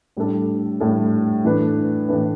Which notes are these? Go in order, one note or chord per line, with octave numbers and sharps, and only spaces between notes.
A2 G3 D4 A4
A2 G3 D4 A4
A2 E3 A3 D4 B4
A2 E3 A3 D4 B4